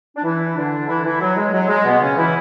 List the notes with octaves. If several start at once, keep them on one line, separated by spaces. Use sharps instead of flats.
D4
E3 E4
D3 D4
E3 E4
E3 E4
F#3
G#3
F#3
G#3
B2 B3
C#3 C#4
E3 E4